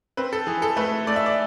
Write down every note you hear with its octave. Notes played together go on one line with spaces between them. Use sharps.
C4 B4
A4
E3 G#4
A4
A3 B4
A3 D5
E5
D5